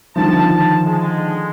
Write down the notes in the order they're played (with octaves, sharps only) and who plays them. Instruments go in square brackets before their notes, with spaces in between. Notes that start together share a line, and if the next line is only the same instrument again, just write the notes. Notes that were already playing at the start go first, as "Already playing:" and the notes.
[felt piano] D3 D#3 F3 [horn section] A5
[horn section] G#3